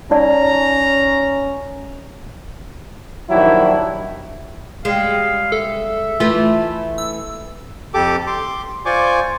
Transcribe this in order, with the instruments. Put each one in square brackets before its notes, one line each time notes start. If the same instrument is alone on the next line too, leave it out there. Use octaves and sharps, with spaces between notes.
[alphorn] C#4 [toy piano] D#4 D5 [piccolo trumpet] A#5
[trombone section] A#1 D#3 F#3 D4 E4 G4
[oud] G3 G#3 [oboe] F5
[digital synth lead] A4 [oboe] E5
[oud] E3 A3 B4 [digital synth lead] F4
[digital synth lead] E6
[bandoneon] F2 G4 A4 D6
C6 D6
F4 C5 D5 G#5 C#6 D6